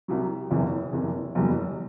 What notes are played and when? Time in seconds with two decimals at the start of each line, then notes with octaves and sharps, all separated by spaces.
0.08 C2 C3 F#3
0.51 F#1 E2 C3 E3
0.92 F#1 E2 C3 E3
1.35 F#1 E2 B2 G3